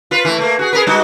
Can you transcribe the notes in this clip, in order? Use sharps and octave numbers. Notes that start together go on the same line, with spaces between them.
F4 B4
E3 A3
A3 A#3
F#4 G#4
G#4 A#4 B4
G3 D#4 F#4